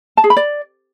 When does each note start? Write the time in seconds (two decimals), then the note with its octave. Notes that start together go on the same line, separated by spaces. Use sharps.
0.17 A5
0.24 G#4
0.30 B5
0.37 D5